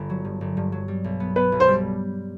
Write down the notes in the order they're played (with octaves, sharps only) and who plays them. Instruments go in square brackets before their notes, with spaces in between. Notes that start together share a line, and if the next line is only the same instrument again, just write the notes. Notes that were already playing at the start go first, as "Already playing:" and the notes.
Already playing: [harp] G1 B3
F#3
G2
G1
G2
F#3
G3
B1
B3
[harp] B3 [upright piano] B4
[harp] B1
[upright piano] C5
[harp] G3